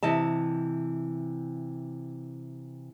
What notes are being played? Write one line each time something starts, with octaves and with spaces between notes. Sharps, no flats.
C3 E3 D#5 A5